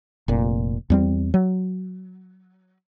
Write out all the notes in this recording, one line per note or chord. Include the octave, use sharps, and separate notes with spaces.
F1 A#2
E2 G3 C4
F#3